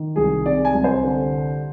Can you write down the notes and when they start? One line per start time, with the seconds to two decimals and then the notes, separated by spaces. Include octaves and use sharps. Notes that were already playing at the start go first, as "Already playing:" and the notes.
Already playing: D#3
0.16 C2 G#4
0.46 C3 D5
0.65 G#5
0.74 C2
0.84 C5
1.04 D3